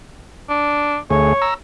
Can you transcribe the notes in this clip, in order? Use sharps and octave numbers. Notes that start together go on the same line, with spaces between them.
D4
D2 A3 G#4 C#5
A#5 E6